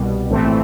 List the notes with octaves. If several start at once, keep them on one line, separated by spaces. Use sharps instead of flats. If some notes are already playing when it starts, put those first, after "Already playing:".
Already playing: C2 B2 G3
A#1 A2 E3 A3 C4